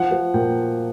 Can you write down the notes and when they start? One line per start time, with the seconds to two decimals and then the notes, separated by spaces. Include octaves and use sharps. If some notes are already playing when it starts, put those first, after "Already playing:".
Already playing: F3 F#5
0.11 F3
0.34 A#2 G5